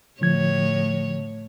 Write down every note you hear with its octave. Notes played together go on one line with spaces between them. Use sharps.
A2 D3 F3 C#5 G#6